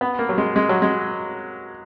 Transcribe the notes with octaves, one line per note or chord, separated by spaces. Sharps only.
B3
A#3
F#3
G#3
G#3
F#3
G#3